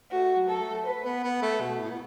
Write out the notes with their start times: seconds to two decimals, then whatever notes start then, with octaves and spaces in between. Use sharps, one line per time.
0.11 A3 F#4
0.36 F#3
0.49 A4
0.61 A3
0.86 B4
1.05 B3
1.23 B3
1.42 A3
1.61 B2
1.80 A2
1.91 B3